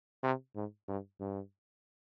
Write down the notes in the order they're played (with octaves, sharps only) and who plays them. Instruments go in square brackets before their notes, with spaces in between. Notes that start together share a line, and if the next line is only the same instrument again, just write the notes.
[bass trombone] C3
G#2
G2
G2